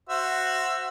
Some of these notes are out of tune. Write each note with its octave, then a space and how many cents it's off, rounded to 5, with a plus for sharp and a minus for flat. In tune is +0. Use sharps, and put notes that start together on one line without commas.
F#4 +0 C5 +0 E5 +15